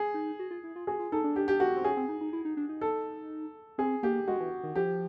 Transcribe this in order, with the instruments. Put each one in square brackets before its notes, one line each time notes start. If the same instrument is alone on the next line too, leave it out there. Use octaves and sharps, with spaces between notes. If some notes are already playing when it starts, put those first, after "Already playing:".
Already playing: [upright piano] G#4
[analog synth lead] D#4
F#4
F4
E4
F4
[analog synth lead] F#4 [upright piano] G#4
[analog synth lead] F4
[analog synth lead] D#4 [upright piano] A4
[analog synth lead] D4
[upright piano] G4
G4
F#4
[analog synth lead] C4
[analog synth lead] C#4 [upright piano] G#4
[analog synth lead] C4
D#4
D#4
E4
D#4
D4
D#4
[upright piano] A4
[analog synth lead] C4 [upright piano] G#4
[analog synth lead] A#3 [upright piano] G4
[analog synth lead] G#3 [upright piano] F#4
[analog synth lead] E3
D#3
[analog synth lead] F3 [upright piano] G4